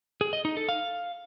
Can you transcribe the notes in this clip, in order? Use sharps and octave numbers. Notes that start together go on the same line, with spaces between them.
G#4
D#5
D#4
A4
F5